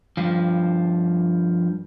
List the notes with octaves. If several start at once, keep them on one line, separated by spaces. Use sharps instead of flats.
G2 F3